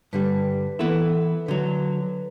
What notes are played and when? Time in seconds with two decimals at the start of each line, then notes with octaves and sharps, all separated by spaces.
0.13 G2 D3 G3 B4
0.79 E3 B3 E4 A4 B4
1.13 A4
1.46 D3 F#3 B4